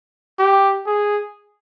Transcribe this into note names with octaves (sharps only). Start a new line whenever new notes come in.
G4
G#4